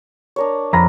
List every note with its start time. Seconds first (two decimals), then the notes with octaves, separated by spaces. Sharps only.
0.36 D4 A#4 C#5
0.73 F2 A#5 B5 A#6